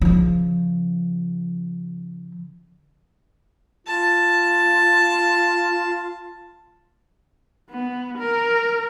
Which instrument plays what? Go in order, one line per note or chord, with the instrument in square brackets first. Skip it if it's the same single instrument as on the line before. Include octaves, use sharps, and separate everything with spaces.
[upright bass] C#3 F3
[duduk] F4 [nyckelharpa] A5
[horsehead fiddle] B3
A#4